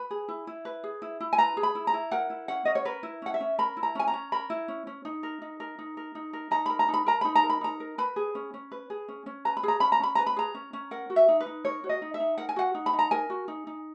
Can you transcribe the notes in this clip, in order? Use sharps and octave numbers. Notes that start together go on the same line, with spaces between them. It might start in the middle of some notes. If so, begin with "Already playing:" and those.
Already playing: B4 B5
G#4
E4
E4
B4
G#4
E4
E4
G#5
B4 A#5
G#4
B5
E4
A#5
E4
A#4 F#5
E4
C#4 F#5
C#4 D#5
C#5
A#4 B4
E4
C#4 F#5
E5
C#4
A#4 B5
E4
A#5
C#4 G#5
A#5
C#4
A#4 B5
E4
C#4
C#4
D#4
A#4
D#4
A#4
D#4
A#4
D#4
A#4
D#4 A#5
A#4 B5
A#5
D#4
B5
A#4 A#5
D#4 B5
A#5
A#4
B5
D#4 A#5
A#4
B4 B5
G#4
C#4
C#4
B4
G#4
C#4
C#4
B4 A#5
B5
G#4 A#5
C#4 B5
A#5
C#4 B5
B4 A#5
B5
G#4 A#5
C#4
C#4
A#4 F#5
F#4
E5
D#4
B4
D#4
A#4 C#5
F#4
D#5
D#4
E5
D#4
A#4 F#5
G#5
F#4 F#5
D#4
B5
D#4
A#5
A#4 G#5
F#4
D#4
D#4